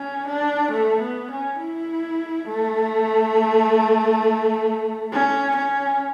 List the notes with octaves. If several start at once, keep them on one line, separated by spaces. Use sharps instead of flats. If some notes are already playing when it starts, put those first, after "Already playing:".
Already playing: C#4
D4
A3
B3
C#4
E4
A3
C#4
C#4